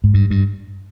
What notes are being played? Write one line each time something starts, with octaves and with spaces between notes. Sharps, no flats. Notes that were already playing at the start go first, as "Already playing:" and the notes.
G#2
G2
G2